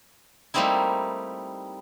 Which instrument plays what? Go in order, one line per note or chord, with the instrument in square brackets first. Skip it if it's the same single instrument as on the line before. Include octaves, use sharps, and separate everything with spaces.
[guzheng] G3 A3 A#3 C4 D#4 E4